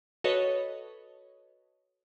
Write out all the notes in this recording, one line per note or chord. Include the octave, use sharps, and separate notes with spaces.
F#4 A4 B4 C#5 D#5